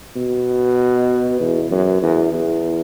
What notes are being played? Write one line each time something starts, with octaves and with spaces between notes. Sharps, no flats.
B2
E2
F#2
E2
E2